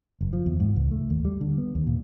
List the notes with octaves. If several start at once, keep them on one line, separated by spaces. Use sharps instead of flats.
F#1
F3
E2
G#2
C#2
A3
D#2
G3
D3
B3
D#2
A#2